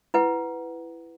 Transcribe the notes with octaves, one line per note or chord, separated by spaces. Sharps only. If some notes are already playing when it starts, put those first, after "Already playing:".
E4 B4 F#5